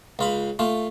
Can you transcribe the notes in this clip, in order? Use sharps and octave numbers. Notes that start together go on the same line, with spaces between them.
C#2 F4 B5
A3 F4